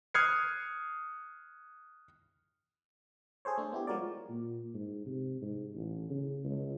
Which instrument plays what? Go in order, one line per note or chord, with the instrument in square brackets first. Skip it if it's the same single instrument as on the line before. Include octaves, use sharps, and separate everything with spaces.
[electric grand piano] D#6 F6 F#6 G#6 C7 C#7
[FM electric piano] G#4 A4 C5 C#5
A3 D4
B3 E4 G4
F3 G#3 F#4 A#4 C#5 D5
[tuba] A#2
G#2
C3
G#2
A1
C#3
C#2